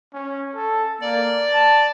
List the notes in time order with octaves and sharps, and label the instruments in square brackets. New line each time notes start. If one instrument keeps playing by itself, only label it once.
[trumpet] C#4
A4
[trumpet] A#3 [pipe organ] D5
[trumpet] A5